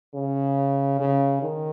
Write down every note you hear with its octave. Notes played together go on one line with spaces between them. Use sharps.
C#3
C#3
D#3